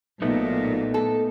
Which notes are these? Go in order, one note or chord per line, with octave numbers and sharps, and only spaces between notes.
B1 A#2 A3 B3 D#4
A4